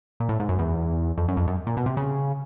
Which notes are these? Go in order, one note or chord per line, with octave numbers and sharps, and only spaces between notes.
A#2
A2
G#2
F#2
E2
F2
F#2
F2
F#2
A#2
B2
C3
C#3